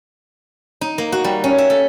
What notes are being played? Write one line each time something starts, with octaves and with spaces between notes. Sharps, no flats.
D#4
A#3
F#4
G3
C#4
E5
A4